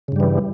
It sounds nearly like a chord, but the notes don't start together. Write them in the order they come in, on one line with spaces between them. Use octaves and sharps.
C#3 G2 G3 E3